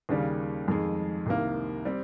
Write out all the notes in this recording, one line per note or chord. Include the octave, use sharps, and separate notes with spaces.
D#2 C#3 G3 A#3
F2 D#3 G#3
C2 C3 D#3 A#3
G3 C4